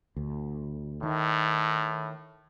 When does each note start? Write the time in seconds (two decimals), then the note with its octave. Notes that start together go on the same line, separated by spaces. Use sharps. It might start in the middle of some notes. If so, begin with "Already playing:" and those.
0.16 D2
1.03 A2 D#3